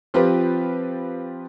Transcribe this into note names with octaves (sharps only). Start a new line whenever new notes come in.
F3 C4 F4 G4 B4